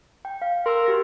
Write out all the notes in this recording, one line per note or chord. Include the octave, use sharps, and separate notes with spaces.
G5
F5
A#4 C6 E6
F#4 G4 A#6